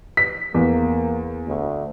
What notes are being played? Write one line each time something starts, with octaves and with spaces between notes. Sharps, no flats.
B6
E2 A#3
D2